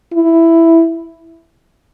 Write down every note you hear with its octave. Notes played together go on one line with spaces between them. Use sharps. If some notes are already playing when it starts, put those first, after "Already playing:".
E4